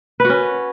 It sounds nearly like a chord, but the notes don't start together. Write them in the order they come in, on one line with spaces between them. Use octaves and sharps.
B4 F#4 C#4